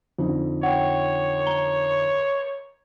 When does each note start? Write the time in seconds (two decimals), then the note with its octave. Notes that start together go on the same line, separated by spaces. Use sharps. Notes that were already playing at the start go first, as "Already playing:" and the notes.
0.18 F2 D3 D#4
0.63 C#5 F#5 G5
1.47 A#5 G7